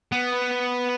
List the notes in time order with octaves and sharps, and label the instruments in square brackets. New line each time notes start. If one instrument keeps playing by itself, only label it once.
[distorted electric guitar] B3